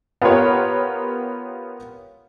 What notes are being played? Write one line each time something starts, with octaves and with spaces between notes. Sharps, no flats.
B3 F4 G4 A#4 C#5